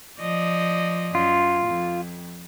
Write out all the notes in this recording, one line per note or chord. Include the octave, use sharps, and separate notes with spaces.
F3 D5 D#5
F#2 F4
F2